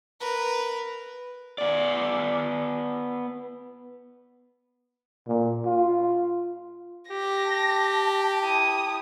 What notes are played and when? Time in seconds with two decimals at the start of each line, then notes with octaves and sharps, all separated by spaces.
0.21 A#4 B4
1.58 B3 D5
5.27 A#2
5.65 F4
7.11 G4 A#6
7.45 A5
8.43 E4 D#6